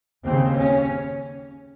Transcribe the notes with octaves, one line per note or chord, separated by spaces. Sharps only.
D#2 C#3 C4
C#4